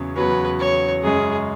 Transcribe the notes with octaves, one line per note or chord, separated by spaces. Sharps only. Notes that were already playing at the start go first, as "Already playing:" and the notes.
Already playing: E2 C#3 F#3 C#4
E2 C#3 F#3 C#4 B4
C#5
F#2 C#3 G#3 C#4 G#4